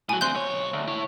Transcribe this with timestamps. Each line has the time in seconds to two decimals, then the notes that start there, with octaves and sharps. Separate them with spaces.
0.09 A2 F#3 G#5
0.21 D2 C4 C6 F#6 G6
0.35 B1 C#5
0.73 D2
0.88 E4 C#5